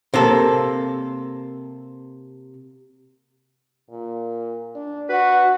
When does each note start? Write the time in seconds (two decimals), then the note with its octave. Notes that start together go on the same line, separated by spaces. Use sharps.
0.14 C3 A#3 A4
3.90 A#2
4.75 D4
5.09 F#4 B4